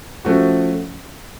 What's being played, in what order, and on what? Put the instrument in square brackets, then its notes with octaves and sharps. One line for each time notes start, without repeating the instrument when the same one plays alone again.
[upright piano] F3 A3 C#4 F#4